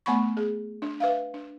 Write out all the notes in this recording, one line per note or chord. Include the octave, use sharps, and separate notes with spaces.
A3 B3 F#5 B5 C#6
G#4
D4
B4 E5 F5
D4